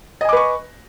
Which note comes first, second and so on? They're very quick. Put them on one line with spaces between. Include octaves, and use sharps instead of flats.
D#5 G#5 D6 B4 C#6